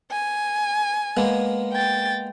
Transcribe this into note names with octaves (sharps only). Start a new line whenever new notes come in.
G#5
G#3 A#3 B3
G5 A6